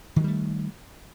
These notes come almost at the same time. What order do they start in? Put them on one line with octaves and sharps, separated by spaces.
D#3 F#3 G3 A3